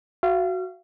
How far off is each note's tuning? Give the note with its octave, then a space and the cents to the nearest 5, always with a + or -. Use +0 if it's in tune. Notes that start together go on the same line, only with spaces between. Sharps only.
F#4 +0 F5 -35